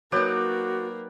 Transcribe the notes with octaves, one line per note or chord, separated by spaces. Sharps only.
F#3 A#3 D#4 F#4 B4 D5 G5